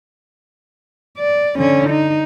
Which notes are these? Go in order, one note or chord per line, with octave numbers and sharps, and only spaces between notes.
D5
D3 C#4
D#4